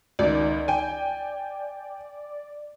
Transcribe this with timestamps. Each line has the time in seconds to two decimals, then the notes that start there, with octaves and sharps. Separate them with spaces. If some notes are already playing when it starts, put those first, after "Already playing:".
0.19 C#2 D#3 D5
0.68 G5 G#5